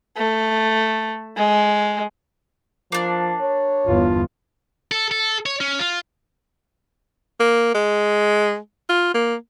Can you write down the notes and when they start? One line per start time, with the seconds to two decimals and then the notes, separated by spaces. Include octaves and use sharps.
0.16 A3
1.37 G#3
2.92 F3 A#3 D4
3.41 C#5
3.86 G1 E2 F4
4.91 A4
5.11 A4
5.46 C#5
5.61 C#4
5.79 F4
7.40 A#3
7.75 G#3
8.89 F4
9.14 A#3